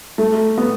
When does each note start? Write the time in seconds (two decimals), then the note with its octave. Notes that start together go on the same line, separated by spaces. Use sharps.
0.18 A3
0.58 B3